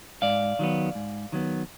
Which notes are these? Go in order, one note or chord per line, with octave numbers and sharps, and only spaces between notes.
G#2 D5 F5
D#3 F#3 B3
G#2
D#3 F#3 B3